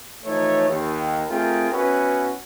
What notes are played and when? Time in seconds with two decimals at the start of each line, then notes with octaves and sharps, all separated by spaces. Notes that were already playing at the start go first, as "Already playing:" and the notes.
0.25 E3 F3 A3 D#4 C#5
0.68 D#2
1.30 A3 C4 F4 G#4 A#4 G5
1.71 B3 C#4 E4 F#4 B4